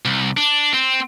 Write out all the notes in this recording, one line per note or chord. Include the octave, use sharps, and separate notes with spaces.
C2
D4
C4